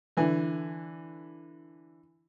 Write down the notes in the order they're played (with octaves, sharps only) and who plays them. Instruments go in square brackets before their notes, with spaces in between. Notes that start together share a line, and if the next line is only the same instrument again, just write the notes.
[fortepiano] D3 E3